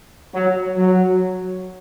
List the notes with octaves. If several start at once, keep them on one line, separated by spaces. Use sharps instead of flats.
F#3
F#3